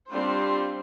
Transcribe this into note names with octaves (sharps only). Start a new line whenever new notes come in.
G3 C4 D4 F4 C5